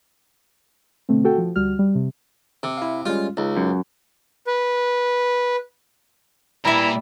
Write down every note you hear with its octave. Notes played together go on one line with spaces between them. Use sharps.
B2 D3 A3 C4
F#4 A4 G5
F3
D2 G3 F#4 F6
G3
C3
C3
E4 F5
G3 G#3 C#4 F4
C#2 D#4
F#2
B4
A#2 E3 G3 E4 E5 A#5